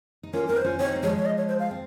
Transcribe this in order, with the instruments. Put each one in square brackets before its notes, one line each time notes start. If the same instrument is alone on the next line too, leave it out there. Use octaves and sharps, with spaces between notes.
[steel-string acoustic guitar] D#4
[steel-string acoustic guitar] C#4 F4 [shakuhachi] A#4
[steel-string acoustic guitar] C4 D#4 [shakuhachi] A#4
[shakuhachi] C5
[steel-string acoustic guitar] C#4 F4
[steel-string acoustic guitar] C4 D#4 [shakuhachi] C#5
[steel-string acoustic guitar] A#3
[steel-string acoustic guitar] F3 G#3 [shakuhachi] C#5
[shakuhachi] C#5
D#5
C#5
C5
F5
[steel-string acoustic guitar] C4